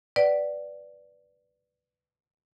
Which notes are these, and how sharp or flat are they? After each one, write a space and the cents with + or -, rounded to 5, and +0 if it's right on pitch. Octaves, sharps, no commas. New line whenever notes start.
B4 +0 D5 +0 F#5 +35